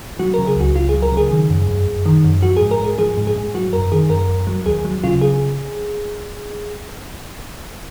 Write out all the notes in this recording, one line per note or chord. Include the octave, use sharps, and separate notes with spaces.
F#3 F#4
C#3 A#4
G#4
C#2 F#4
C#2 F4
G#4
F#3
A#4
C#3 G#4
D#3
F#2
F#2
F#2
D#3
F#2
F3 F#4
G#2 G#4
A#4
G#2 G#4
F3 G#4
G#2
G#4
G#2
F#3 F#4
F#2 A#4
D#3 G#4
F#2 A#4
F#2
F#3
D#2 G#4
F#3
C#3 F4
G#4